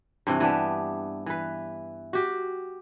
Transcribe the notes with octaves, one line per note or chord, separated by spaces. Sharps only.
G2 C3 E3
E3 B3 D4 G4
E3 B4
F#4 G4